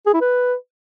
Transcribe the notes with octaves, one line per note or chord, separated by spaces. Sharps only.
G#4
E4
B4